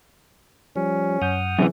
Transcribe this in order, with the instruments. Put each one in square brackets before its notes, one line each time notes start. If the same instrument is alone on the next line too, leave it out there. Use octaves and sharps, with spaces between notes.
[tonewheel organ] F3 G3 [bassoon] C#4
[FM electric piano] F#2 G6 [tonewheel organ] F#5 D#6 F6
[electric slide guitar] F#2 C3 E3 [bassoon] G#4